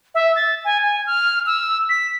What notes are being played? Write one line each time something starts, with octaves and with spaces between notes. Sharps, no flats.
E5
A6
G#5
G#5
F6
E6
B6